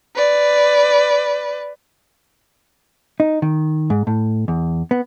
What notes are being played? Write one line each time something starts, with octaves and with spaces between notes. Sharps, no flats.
B4 D5
D#4
D#3
G#2
A2
E2
B3